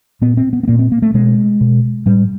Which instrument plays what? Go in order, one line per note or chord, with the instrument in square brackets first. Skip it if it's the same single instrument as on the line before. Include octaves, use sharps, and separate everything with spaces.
[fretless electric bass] A#2 B3
C4
B3
B3
A#2 A#3
C4
A#3
A3
B2 G#3
B2
A2 G3